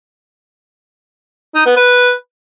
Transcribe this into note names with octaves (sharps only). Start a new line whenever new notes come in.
D#4
B3
B4